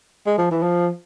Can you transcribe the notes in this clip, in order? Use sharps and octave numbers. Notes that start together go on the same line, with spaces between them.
G#3
F3
E3
F3